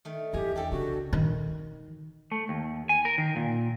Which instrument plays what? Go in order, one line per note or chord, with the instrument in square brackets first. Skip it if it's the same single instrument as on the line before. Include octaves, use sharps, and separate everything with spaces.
[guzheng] D#3 A3
[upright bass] E2 [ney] G4 [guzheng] G#5 A#5
[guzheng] D4 G4 A4 [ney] G5
[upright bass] C#3 [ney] F#4
[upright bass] D#3 D#4
[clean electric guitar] A3
D#2
G#5
A#4
D#3
A#2